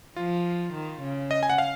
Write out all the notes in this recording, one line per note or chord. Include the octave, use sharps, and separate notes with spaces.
F3 F4
D#3
C#3
D#5
G#5
F#5
F5